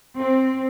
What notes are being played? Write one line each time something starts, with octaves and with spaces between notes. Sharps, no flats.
C4